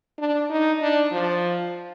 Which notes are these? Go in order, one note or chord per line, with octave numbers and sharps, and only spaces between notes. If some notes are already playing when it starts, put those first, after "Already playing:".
D4
D#4
D4
F3